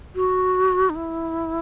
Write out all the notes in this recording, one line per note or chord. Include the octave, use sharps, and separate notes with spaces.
F#4
D#4
E4